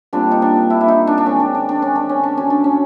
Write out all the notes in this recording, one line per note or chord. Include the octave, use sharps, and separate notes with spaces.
A#2 G3 C4 D4
D#4
D4
E4
E4
D#4
D4
D4
D#3 G#3 C4 C#4
D4
D4
D4
C#4
D4
C#4
D4
F#2 D3 F#3 C#4
D4
C#4